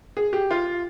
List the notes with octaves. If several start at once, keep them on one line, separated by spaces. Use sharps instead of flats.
G#4
G4
F4